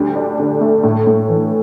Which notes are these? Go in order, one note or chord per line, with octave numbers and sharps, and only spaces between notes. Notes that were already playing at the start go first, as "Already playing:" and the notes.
Already playing: D2 G3
D4
D3
A3
A2
A2
E3